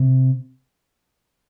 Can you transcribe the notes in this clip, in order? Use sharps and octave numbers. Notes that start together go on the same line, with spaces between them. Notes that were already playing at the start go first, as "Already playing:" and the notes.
Already playing: C3